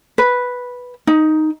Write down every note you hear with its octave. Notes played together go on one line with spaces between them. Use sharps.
B4
D#4